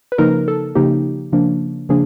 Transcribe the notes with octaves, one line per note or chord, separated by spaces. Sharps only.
B4
C#3 F3 A#3 D#4 A#4
A4
C#3 F3 A#3 D#4 G4
C#3 F3 A#3 D4
C#3 F3 A#3 D4 G#4